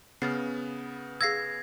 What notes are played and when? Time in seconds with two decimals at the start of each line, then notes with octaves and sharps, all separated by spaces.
0.22 C#3 B3 F6 A6 C7
1.21 G#4 F5 E6 G#6 A#6 C7